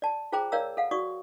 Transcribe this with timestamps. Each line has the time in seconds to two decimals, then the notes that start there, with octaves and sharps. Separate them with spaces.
0.02 D5 A5
0.32 F4 G#4 C5 G5 A#5 D6
0.52 A#4 C#5 D5 F5 A#5 E6
0.77 A4 F5 F#5
0.91 F#4 D5 C#6 D#6